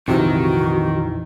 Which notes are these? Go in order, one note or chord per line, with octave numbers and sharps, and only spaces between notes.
A#1 F2 C3 D#3 E3 F#4